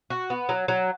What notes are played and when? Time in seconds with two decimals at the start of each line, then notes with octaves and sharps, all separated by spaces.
0.10 F#4
0.30 B3
0.49 F#3
0.68 F#3